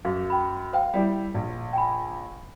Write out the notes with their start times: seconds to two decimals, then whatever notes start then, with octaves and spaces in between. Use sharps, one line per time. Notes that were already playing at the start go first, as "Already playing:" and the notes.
0.05 F#2 G#4 F5
0.30 G5 B5
0.73 C5 F5 G5
0.94 G3 E4 G4
1.35 A#1
1.73 G5 G#5 B5